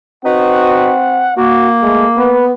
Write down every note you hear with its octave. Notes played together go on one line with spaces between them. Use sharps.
C4 D#4 F#4 B4 F#5
A#3 F#4
G#3 A3
B3 B4